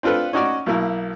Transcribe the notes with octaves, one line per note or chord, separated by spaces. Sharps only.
C4 D4 F4 A4 B4
C#4 D#4 F#4 C#5 D5
B1 B2 A#3 E4